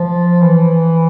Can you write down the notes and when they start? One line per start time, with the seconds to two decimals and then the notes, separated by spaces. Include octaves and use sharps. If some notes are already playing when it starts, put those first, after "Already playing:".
Already playing: F3
0.42 E3